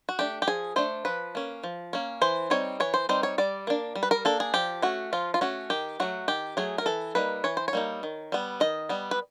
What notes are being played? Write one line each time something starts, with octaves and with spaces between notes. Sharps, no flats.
F#4
A3 D4 G4
G4
F3 G#4
A3 D4 C5
F3 B4
A#3 C#4
F3
A#3 C#4
E3 C5
G3 C4 D#4 C#5
E3 C#5
C5
G3 C4 D#4 C5
C#5
G3 D5
A#3 D4
G3
B4
A#4
A#3 D4 A4
G#4
F3 G4
A3 C#4 F#4
F3 F4
F4
A3 C#4 F#4
D#3 G4
F#3 A3 F#4
D#3 G4
F#3 A3 G#4
A#4
E3 A4
G3 A#3 D#4 B4
E3 C#5
C5
C#5
G3 A#3 D#4
D#3
G3 B3
D#3 D#5
G3 B3
B4